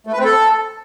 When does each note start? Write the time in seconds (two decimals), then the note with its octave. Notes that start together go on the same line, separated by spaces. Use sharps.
0.07 A3
0.13 B4
0.19 C4
0.25 A4